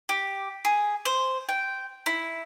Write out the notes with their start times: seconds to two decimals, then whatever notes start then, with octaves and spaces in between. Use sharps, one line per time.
0.09 G4
0.65 G#4
1.05 C5
1.49 G5
2.06 E4